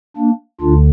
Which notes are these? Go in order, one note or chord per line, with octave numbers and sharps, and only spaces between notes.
A#3 D4
D2 D3 D4 F4